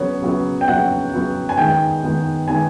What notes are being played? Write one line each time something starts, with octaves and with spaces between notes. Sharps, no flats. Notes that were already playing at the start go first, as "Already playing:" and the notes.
Already playing: C#3 F#3 B3 C#5
C#3 F#3 B3
G5
C#3 F#3 B3 F#5
C#3 F#3 B3
G#5
D#3 G#3 B3 G5
D#3 G#3 B3
D#3 G#3 B3 G#5